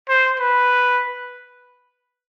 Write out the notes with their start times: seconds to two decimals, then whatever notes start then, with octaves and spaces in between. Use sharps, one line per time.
0.09 C5
0.39 B4